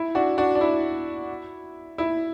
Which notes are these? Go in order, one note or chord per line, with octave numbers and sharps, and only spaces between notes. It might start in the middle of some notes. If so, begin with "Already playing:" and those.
Already playing: E4
D4 F#4
D4 F#4
D4
E4
E4